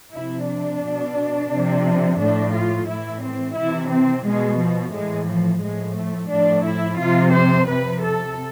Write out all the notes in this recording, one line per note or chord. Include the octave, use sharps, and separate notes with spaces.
C3 F3 E4
D4
B2
C3 F3
A2 F3 D4
F4
A2 E3 E4
C4
C3 E3 E4
C4
B2 G#3
F3
A2 E3 G#3
F3
A2 F3 G#3
A3
A2 F3 D4
E4
C3 F3 F4
C5
C3 F3 B4
A4